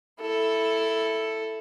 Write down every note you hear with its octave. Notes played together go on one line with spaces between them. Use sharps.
E4 A4